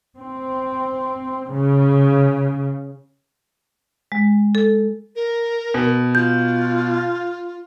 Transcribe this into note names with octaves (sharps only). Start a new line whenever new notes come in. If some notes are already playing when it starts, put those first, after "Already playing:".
C4
C#3
G#3
A4
A#4
B2
F4 G6